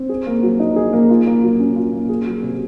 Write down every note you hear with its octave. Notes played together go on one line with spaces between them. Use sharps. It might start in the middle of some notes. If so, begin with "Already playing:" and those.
Already playing: C4
G#4
A#3
F#3
D#4
G#4
A#3
F4
A#3
F#3
C#4
F4
A#3
G#4
F#3
C3